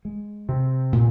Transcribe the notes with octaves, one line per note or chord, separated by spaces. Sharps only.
G#3
C3
A#2